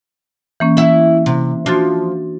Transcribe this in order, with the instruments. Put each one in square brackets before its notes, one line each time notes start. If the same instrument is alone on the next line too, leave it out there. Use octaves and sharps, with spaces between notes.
[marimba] E3 A#3 C#4
[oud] E4 E5
C3
[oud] F3 [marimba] D4 F#4 A6